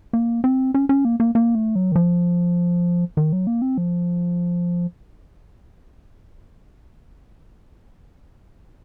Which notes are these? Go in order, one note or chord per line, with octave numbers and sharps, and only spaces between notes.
A#3
C4
C#4
C#4
A#3
A#3
A#3
A3
F#3
D#3
F3
D#3
F#3
A#3
C4
F3